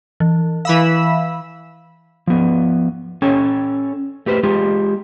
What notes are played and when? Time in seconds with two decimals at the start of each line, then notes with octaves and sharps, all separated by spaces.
0.20 E3
0.65 E3 F5 B5 E6
2.27 F3 B3
3.22 C#4 A4 C#5 G5
4.26 A3 G4 B4 C5
4.43 G#3 F4 G4